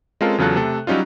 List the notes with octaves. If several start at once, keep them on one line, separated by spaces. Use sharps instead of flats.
G#3 C4 C#4 F4 A4 A#4
E2 C#3 F#3 F4 A4 F#6
C3 A3 A4
F#3 G3 C#4 D#4 F4